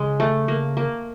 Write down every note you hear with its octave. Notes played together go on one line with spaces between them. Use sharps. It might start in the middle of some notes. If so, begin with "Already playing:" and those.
Already playing: C#3 G#3
A3
A#3
A#3